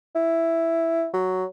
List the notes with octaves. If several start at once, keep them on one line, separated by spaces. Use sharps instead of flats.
E4
F#3